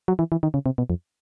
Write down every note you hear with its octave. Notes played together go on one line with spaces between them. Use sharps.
F#3
E3
E3
D#3
C#3
C3
B2
F2